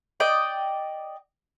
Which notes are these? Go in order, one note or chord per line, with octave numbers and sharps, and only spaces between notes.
D5 D#5 G5